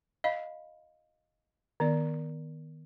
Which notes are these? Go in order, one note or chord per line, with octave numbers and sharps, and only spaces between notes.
D#5 F5 B5
D#3 B3 D5